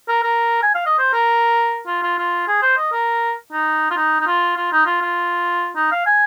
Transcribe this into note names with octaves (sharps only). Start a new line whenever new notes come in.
A#4
A#4
G#5
F5
D#5
C5
A#4
F4
F4
F4
G#4
C5
D#5
A#4
D#4
F4
D#4
D#4
F4
F4
D#4
F4
F4
D#4
F5
G#5